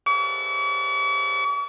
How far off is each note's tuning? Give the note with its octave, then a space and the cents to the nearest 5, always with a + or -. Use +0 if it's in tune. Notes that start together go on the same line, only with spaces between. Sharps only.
C#6 +45